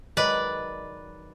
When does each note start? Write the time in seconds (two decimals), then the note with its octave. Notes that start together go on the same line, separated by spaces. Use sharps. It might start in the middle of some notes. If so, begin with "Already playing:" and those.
0.17 D#3 F#3 G#3 B4 D5